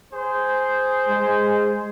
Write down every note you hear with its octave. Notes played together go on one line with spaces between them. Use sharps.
G#4 C5
G#3